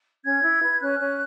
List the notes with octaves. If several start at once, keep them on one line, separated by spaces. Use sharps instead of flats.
C#4 G#6
E4
B4
C#4 F#6
C#4